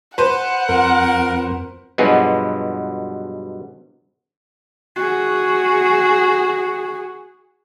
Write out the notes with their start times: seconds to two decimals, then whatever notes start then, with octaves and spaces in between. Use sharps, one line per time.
0.18 B4 C5 F#5
0.69 F2 A#4
1.98 G2 B2 F3 F#3 G#3 B3
4.96 F#4 G#4